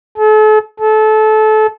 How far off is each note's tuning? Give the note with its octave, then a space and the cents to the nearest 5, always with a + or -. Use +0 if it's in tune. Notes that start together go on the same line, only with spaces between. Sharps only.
A4 -40
A4 -25